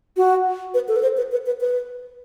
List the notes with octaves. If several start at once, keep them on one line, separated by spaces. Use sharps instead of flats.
F#4
B4
A4
B4
C5
B4
B4
B4
B4